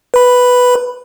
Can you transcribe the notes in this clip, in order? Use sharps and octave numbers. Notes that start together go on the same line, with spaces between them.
B4 B5